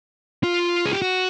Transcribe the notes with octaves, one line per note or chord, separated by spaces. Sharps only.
F4
G#4
G4
F#4